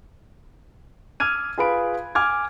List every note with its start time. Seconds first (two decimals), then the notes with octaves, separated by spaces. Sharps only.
1.20 D6 E6 F6 G#6 D#7
1.58 F4 G#4 B4 B5 D7
2.15 G#5 D6 F6 G#6